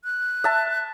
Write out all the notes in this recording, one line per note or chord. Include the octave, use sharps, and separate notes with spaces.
F#6
E5 A5